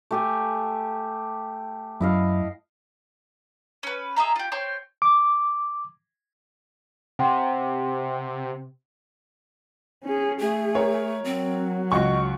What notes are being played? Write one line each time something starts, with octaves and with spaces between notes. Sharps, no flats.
A3 G4 G#5
F#2 E4 D#5 F5
C#4 B4
G#4 D#5 E5 A#5
F4 G4
C4 C#5 G5 C6
D6
C3 F#5 G5 C6
C#4 G#4
A3 G#4
A#4 C#5
F#3 C4
C#2 F#4 D#5 C#6